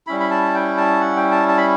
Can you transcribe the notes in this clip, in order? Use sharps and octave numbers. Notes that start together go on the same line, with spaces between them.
G3 C#4 E4 B5
B5
A5
G5
A5
F#5
G5
A5
A5
B5